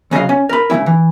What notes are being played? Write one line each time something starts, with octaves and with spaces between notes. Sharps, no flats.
C2 C#3 F#3 D#5 F5
C#4
A#4 B5
G#2 C#3 F3 C#4 E4
E3